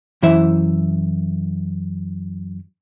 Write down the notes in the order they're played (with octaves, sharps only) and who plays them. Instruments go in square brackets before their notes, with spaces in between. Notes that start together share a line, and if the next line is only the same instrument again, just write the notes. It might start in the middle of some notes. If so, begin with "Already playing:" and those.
[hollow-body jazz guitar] F#2 E3 E4 C5 E5